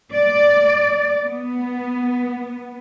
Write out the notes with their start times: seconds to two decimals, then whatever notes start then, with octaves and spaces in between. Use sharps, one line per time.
0.15 D5
1.24 B3